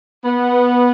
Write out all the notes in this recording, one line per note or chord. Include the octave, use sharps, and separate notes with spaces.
B3